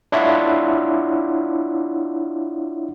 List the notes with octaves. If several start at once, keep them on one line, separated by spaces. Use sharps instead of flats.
D4 E4 F4 C#5 E5 F#5